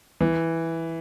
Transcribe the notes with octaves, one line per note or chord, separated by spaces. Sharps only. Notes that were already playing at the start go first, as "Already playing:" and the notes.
E3